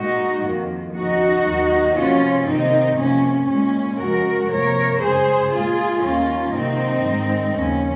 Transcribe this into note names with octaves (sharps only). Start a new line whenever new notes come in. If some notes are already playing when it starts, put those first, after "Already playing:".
Already playing: A#2 G#3 D#4 F#4
F2 D#3 A#3
D#2 C#3 F3 D#4 F#4
D#2 D#3 F#3
C3 F3 A#3 C#4 F4
C3 D#3 A#3 C4 D#4
F2 C3 F3 A#3 C#4
A#2 G#3 C#4
F2 C#3 G#3 F#4 A#4
C3 F3 A#3 A#4 C#5
F#2 C#3 G#3 G#4 C5
A#2 G#3 F4 G#4
D#2 D#3 A#3 C#4 F4
C3 D#3 F#3 A#3 C4 D#4
G#2 D#3 G#3
D#2 C#3 F3 A#3 C#4